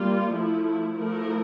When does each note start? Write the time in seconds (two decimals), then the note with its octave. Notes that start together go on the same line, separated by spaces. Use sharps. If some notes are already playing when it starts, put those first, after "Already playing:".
Already playing: G3 A#3 F4
0.34 F3 A3 E4
0.96 F3 A3 E4 A#4